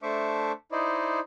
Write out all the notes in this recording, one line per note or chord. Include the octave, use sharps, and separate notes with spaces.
A3 D4 C5 E5 C#6 D6
D#4 E4 C5 D5 D#5